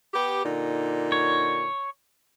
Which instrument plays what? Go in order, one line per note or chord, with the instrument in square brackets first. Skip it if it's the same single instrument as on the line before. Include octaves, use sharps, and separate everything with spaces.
[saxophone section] B3 G4
A#2 D3 D#4
[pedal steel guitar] C#5